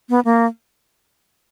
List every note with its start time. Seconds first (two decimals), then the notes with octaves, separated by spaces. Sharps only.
0.09 B3
0.25 A#3